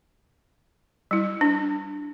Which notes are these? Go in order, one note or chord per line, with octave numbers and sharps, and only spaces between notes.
G3 E4
D4